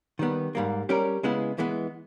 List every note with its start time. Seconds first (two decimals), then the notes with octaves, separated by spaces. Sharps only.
0.19 D#3 G3 B3
0.55 G#2 G3 A#3
0.89 G3 C#4 G4 A#4
1.23 C#3 G#3 B3 E4
1.58 E3 G#3 B3